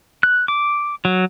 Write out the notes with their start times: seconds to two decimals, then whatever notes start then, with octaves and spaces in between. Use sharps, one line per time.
0.23 F#6
0.48 D6
1.05 F#3